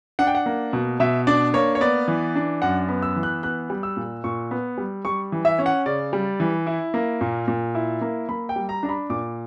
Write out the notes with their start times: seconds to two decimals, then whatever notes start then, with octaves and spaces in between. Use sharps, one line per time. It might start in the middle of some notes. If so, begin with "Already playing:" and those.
0.19 D4 F#5
0.27 G5
0.35 F#5
0.46 A#3
0.73 B2
1.00 B2 E5
1.27 D4 D5
1.54 A#3 C#5
1.75 C#5
1.81 B3 D5
2.08 E3
2.36 D4
2.62 F#2 F#5
2.89 B3
3.02 E6
3.16 E3
3.23 F#6
3.43 B3 F#6
3.70 G3
3.83 E6
3.97 A#2
4.24 A#2 C#6
4.51 B3
4.78 G3
5.05 G3 C#6
5.32 E3
5.45 E5
5.59 C#4
5.66 F#5
5.86 C#3 D5
6.13 G3
6.40 E3
6.67 E4
6.94 A#3
7.21 A#2
7.48 A#2
7.75 E4
8.01 A#3
8.29 A#3 B5
8.49 G5
8.56 G3
8.69 A#5
8.83 D4 A#5
8.89 B5
9.10 A#2 D6